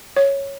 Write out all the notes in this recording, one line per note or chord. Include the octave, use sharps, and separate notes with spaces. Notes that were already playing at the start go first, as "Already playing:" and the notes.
C#5